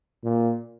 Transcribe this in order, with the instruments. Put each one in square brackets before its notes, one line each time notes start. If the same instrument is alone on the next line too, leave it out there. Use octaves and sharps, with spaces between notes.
[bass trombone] A#2